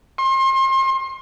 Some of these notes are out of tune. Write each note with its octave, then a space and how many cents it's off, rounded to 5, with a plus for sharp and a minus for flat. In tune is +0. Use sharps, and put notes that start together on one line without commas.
C6 +35